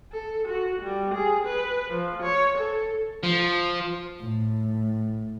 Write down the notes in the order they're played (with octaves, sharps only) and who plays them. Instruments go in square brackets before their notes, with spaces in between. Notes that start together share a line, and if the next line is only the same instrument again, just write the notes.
[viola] A4
F#4
G3
G#4
B4
F3
C#5
A4
[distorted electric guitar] F3
[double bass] A2